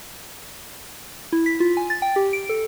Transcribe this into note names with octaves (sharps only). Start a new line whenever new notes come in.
E4
B6
F4
G#5
A6
G5
G4
D7
A4